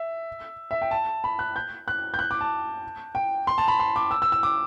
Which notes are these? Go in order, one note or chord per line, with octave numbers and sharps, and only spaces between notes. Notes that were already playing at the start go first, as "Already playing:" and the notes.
Already playing: E5
E5
G5
A5
B5
F#6
G6
F#6
G6
F#6
D6
A5
G5
C6
A5
B5
C6
D6
E6
E6
E6
D6